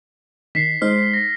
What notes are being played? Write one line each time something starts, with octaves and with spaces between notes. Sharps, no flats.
D#3 B6 C7
G#3 D#4 C5 F6
A#6